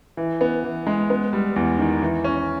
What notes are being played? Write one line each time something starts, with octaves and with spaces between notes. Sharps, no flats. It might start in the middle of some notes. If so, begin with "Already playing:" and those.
E3
B3
E3
G#3
B3
G3
E2
D#3
E3
C#4